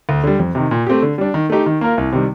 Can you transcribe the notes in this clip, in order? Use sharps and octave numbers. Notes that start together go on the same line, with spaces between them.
D2
D3 G3
F2
C3 D#3
A#2
A3 C4 G4
D3
G3 D4
D#3
A3 D#4 G4
D#3
A#3 F4 A#4
C2
C3 D#3 G3